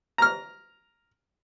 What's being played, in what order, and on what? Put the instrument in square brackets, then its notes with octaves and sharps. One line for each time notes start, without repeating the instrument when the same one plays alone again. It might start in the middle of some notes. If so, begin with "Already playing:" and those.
[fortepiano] A#5 F6